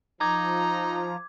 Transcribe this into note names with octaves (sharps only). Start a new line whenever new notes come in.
F3 D#4 A#5 D6 G#6